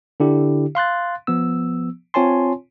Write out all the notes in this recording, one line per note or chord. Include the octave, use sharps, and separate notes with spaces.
D3 D4 E4 G4
F5 C6 F#6 A6
F3 B3 E6
C4 F4 C#5 G#5 A5 C6